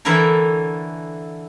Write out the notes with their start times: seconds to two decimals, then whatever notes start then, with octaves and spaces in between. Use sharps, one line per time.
0.05 D3 E3 E4 A4 A#4 C#5